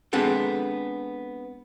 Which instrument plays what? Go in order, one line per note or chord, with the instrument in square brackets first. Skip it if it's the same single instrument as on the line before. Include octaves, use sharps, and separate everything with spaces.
[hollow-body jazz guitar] G#3 B3 C4 D4 A4 F#5